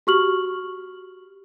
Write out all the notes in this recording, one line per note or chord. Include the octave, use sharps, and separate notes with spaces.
F#4 G4 C#6 F6 F#7